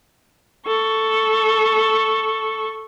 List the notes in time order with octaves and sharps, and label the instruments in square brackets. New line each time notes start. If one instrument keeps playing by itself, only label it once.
[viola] A4 C#6